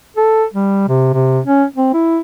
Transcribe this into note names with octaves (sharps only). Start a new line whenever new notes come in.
A4
G3
C3
C3
C#4
C4
E4